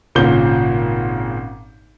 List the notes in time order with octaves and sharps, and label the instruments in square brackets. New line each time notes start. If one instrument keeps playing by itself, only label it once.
[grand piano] G#1 A#2 C#3 G6 G7